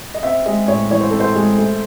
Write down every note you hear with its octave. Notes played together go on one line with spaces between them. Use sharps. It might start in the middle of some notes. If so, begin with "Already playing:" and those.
D#5
C4 E5
G#3 D#5
A2 C#5
E3 C#5
C5
C4 A4
C5
G#3
A3